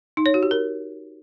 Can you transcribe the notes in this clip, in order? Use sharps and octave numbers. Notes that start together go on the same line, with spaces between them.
D#4
C#5
F#4
G4
A#4